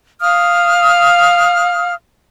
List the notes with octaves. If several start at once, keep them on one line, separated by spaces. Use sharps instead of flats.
F5 D#6 F6